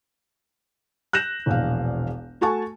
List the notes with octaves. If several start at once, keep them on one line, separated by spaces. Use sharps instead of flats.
F#6 G6 A#6 E7
E1 A#1 F5
A3 F#4 G#5 A5 C#6